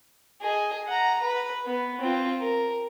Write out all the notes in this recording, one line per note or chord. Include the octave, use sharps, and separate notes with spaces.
G#4 D#5
F#5 A#5
B4
B3
C4 F4
A#4